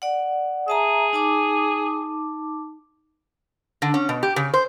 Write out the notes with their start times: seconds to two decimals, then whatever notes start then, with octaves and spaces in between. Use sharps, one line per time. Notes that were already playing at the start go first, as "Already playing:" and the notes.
0.02 D5 F#5
0.68 G#4 E5 A5 A#5
1.13 D#4 A5 D6
3.82 D3
3.94 C#4
4.09 B2
4.23 G4
4.36 C#3
4.54 C5